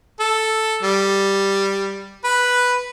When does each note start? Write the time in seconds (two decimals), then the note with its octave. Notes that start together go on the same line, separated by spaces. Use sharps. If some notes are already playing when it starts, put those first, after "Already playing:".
0.20 A4
0.83 G3
2.24 B4